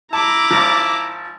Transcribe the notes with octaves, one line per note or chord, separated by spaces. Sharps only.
E4 A5 A#5 D6
G#1 F3